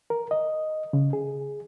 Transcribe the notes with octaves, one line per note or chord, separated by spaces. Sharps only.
A#4
D#5
C#3
G#4